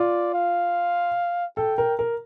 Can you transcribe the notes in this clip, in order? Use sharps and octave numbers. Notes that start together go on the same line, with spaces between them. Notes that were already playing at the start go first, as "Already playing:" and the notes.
Already playing: F4 D5
F5
A4 G5
A#4
A#4